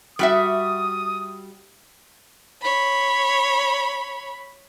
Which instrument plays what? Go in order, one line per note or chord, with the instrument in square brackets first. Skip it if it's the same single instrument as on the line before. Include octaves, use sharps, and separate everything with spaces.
[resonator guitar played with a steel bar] G3 F#4 E5 [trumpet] D#6
[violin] C#5 B5